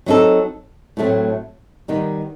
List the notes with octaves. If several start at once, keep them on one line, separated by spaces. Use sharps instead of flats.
F#3 C4 D#4 F#4 A4
A2 F#3 A3 C4
D#3 G3 B3 D#4